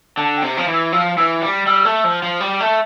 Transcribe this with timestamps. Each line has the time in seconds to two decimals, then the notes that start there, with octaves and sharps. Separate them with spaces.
0.17 D3 A5
0.37 G5
0.43 C3
0.56 F3 A#5
0.68 E3
0.74 E6
0.92 F3 E6
1.17 E3 E6
1.42 G3 D6
1.66 G3 E6
1.85 A3
2.04 F3
2.23 F3
2.41 G3
2.60 A3